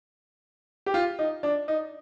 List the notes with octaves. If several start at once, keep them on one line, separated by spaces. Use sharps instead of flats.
G4
F4
D#4
D4
D#4